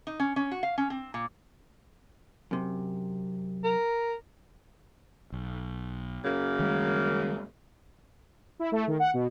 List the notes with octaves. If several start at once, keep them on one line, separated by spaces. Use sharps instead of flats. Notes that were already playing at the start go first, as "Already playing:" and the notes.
D#4
C#4
C#4
F#4
F5
C#4
C4
A#2
F#2 C3
A#4
B1
F#2 C#3 A#3
D#3 G3 G#3
E4
A3
D#3
F#5
B2